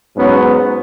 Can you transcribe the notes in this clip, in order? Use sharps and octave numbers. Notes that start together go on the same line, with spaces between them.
G#2 F#3 B3 C#4